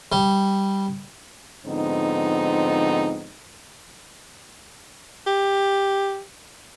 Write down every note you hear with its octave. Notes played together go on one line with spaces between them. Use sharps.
G3
G#2 D3 F3 B3 C4 D#4
G4